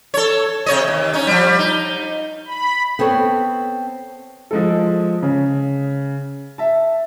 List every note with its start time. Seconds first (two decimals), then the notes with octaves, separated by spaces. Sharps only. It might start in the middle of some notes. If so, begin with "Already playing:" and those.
0.14 A4 C#5
0.66 C3 C#5 D#5
0.88 D#2
1.13 C#4 D#4
1.27 F3 G3
1.59 D#4
2.45 B5
2.99 B3 C4 A4 C#5
4.51 F3 G#3 A4
5.23 C#3
6.58 E5 A5